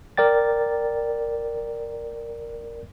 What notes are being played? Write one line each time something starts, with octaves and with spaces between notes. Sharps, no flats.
A#4 D5 G5 A6